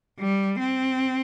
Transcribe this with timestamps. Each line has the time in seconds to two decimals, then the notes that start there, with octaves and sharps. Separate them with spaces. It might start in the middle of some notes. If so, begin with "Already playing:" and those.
0.19 G3
0.60 C4